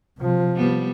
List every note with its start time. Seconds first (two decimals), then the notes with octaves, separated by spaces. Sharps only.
0.19 C3 F3
0.56 G3 B3